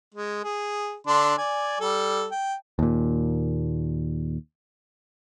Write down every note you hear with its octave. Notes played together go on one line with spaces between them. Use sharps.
G#3
G#4
D3 D4 C6
D5 G#5
G3 A4
G5
D#2 A#2